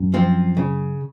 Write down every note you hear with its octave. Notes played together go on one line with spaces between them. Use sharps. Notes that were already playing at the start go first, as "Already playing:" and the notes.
Already playing: F#2
F3 C4 F4
C#3